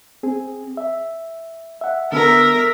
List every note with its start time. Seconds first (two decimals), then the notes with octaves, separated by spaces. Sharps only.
0.23 C4 G#4
0.77 E5
1.81 E5 F#5
2.12 D3 B3 A#4 E5